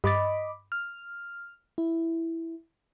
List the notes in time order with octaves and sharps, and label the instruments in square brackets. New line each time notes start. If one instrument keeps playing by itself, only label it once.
[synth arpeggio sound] G2 A6 [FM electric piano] D#5 B5 D6
[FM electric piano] F6
E4